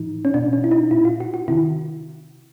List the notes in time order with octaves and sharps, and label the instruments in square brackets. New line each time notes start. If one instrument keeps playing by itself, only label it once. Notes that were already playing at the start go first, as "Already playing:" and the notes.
Already playing: [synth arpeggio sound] A2 E3 D#4
C#4
B2 D4
C#4
E4
D#4
A#2 E4
F4
F#4
F#4
C3 D#3 E4